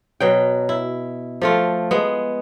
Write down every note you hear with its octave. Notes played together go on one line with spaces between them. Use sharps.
B2 F#3 G5
E4
F3 A3 F4
G#3 B3